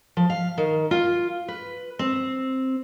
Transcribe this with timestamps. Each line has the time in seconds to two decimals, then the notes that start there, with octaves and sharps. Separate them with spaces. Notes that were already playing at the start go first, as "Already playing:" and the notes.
0.17 F3
0.30 F5
0.58 D#3
0.91 F4
1.48 B4
1.99 C4